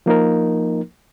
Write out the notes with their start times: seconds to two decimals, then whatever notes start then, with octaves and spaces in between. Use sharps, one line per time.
0.06 F3 A#3 D#4 A#4